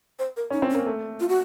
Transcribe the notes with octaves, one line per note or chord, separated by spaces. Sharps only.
C5
A#4
C#4 D#4
C4
C#4
A#3
A3
F4
F#4